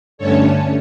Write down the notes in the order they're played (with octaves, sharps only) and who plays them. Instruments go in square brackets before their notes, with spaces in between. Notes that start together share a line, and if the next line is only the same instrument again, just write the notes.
[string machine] G2 D3 A3 C#4 A4 C#5